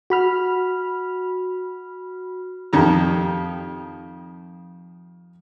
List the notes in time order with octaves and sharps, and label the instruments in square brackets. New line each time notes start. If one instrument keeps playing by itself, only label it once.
[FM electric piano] F#4 B5 F6
[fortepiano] F2 D#3 G4 A#5